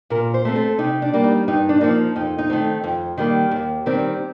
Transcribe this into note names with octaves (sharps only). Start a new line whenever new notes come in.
A#2 A#4
C5
A3 C4
A4
C3 D#4
D4
G3 A#3
D#4
G2 D#4
D4
F3 A#3 D#4
F2 D#4
D#4
D#3 A3 C4
F2
D#3 G3 A#3
D#2
D#3 G3 C4